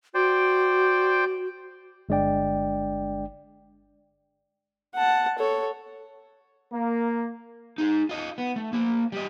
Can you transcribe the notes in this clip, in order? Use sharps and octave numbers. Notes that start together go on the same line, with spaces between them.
F#4 C5 D5 G5
G1 G#3 D4 D5 G5
F#5 A5
A4 C#5
A#3
D#4 G#4
F4 D#5
B3
A3
A#3 C5
G3 D#5